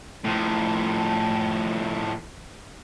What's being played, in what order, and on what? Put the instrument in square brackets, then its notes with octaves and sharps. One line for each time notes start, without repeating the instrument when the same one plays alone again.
[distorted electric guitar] A2 F3